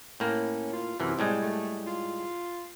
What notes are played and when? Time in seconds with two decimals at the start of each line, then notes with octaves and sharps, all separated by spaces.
0.20 A2 A#3 C#4
0.73 F4
1.00 F#2 C3 E3
1.19 A2 G3 G#3
1.42 A3
1.87 F4